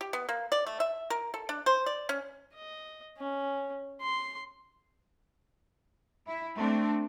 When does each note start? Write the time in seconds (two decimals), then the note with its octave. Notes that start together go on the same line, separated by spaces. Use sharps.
0.01 G4
0.13 B3
0.29 A#3
0.52 D5
0.67 A3
0.80 E5
1.10 A#4
1.34 A4
1.49 D4
1.66 C5
1.86 D5
2.09 C#4
2.54 D#5
3.18 C#4
4.02 C6
6.27 E4
6.56 A3 C4 D4